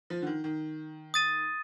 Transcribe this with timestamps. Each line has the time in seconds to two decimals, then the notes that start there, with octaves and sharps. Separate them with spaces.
0.10 F3
0.22 D3
0.27 D#3
0.44 D#3
1.14 D#6 A6 D#7